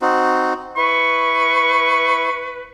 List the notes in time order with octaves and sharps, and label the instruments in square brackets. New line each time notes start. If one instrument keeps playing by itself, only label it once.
[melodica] C4 D#4 F#4
[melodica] E4 [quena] B4 [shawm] C#6